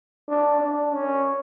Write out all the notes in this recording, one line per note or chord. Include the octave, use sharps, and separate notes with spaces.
D4
D4
C#4